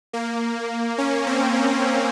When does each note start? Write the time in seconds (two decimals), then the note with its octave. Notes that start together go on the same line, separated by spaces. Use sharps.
0.13 A#3
0.98 C#4
1.27 C4
1.54 A#3